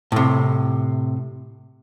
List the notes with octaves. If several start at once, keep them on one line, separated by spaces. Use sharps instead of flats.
A2 C3